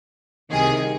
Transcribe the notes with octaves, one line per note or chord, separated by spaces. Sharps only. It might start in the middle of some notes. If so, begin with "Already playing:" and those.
C2 C3 D#3 G#4